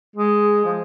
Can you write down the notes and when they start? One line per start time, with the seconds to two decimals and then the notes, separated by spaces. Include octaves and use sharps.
0.16 G#3
0.65 F3